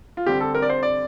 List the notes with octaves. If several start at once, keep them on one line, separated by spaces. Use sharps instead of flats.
F4
D3 G3 C4 G4
A4
A#4
D5
C5
D5